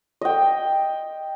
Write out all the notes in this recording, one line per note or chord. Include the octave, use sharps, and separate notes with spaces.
D#5 G5